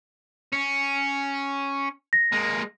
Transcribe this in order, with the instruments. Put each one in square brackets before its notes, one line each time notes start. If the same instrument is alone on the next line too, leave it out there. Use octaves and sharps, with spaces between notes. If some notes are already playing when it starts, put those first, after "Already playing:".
[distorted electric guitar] C#4
[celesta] A#6
[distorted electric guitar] G#3 A#3